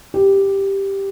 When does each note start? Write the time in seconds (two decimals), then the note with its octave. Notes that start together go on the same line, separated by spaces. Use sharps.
0.14 G4